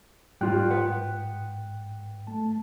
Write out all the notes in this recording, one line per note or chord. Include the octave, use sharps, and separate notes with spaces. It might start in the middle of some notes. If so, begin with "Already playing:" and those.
G#2 G3 F4 G5 F#6
B4 F#5
A3 A5